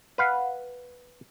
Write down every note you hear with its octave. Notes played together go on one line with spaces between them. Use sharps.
B4 F5 F#5